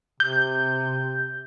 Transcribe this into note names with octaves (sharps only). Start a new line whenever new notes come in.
C3 G6